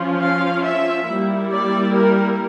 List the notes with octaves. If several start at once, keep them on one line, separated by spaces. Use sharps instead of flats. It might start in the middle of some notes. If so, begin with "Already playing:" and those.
Already playing: F3 C#4 F4
F5
E5
G3 A#3 E4
D5
A#4